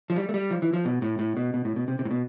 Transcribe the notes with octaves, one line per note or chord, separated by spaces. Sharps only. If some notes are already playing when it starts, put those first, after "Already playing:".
F3
G3
A3
G3
F3
E3
F3
B2
A2
A2
B2
B2
A2
B2
C3
C3
A2
B2